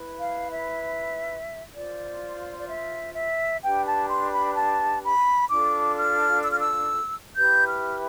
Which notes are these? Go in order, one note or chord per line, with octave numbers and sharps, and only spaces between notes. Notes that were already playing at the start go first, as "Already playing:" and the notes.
Already playing: E4 B4
F5
E5
F4 C5 D5
D5
E5
E5
D4 G4 B4 G5
A5
C6
B5
A5
B5
D4 F4 A4 D6
F6
E6
F6
E6
E4 G4 B4 G6
F6